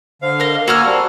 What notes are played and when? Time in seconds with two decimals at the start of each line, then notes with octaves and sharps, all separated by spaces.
0.22 D3 C5 F5
0.40 A#4 D#5 F6
0.68 A#3 F#4 G#5 A#5 E6 F6
0.86 G3 C4 A5